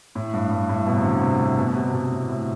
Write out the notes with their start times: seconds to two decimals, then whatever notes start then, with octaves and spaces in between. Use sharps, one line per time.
0.15 A2
0.34 G2
0.51 G2
0.69 A2
0.86 B2
0.97 C3
1.04 D3
1.22 C3
1.39 A2
1.58 B2
1.68 B2
1.75 C3
1.93 B2
2.11 A2
2.29 A2